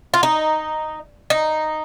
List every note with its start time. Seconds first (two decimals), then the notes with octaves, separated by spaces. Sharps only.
0.14 F4
0.23 D#4
1.30 D#4